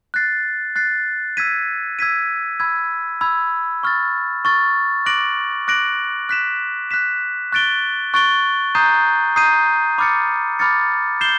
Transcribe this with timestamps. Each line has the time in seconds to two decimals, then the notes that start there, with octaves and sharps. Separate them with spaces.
0.14 F#6 A6 C7
0.76 F#6 A6 C7
1.37 E6 G#6 B6 D#7
1.99 E6 G#6 B6 D#7
2.60 B5 E6 G#6
3.21 B5 E6 G#6
3.83 C#6 F6 A6
4.45 C#6 F6 A6
5.06 D6 F#6 A#6 D7 F#7
5.67 D6 F#6 A#6 D7 F#7
6.29 F#6 B6 E7
6.91 F#6 B6 E7
7.52 C#6 F#6 A6 D7 G7
8.14 C#6 F#6 A6 D7 G7
8.75 A#5 D#6 G6 C7 D#7
9.36 A#5 D#6 G6 C7 D#7
9.98 B5 D6 F6 A6 C#7
10.59 B5 D6 F6 A6 C#7
11.21 G6 C7 E7 G7